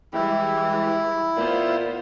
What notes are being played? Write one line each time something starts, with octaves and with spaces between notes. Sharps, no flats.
E3 G3 G#3 E4 G4
A#2 B3 F4 C5